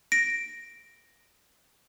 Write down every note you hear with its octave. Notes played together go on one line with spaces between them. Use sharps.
A#6 D7